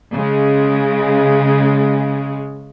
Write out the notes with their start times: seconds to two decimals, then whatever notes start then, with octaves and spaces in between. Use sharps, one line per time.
0.15 C#3 G#3